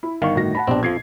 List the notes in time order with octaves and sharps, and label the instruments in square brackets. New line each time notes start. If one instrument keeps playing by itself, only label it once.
[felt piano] E4
[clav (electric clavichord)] G1 D#3 [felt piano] F5 C#6
[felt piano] A2 F#4 A#6
F#5 A5 B5
[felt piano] A#1 B2 G4 [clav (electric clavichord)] C4 D4
[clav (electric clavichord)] F2 F3 [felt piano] G#6 C7